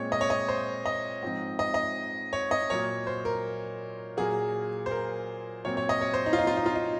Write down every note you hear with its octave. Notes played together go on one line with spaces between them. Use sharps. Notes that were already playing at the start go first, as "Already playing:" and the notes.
Already playing: A#2 G#3 C4 C#5
D#5
C#5
D#5
C5
D#5
G#2 F3 C4
D#5
D#5
C#5
D#5
A#2 F#3 A#3 C#5
C5
A#4
A#2 F#3 A#3 G#4
C5
A#4
A#2 F#3 C4 C#5
C#5
D#5
C#5
C5
D#4
F4
D#4
F4
D#4
F4
D#4